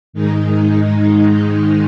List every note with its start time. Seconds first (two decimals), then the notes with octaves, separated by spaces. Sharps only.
0.13 G#2 D#3 G#3 D#4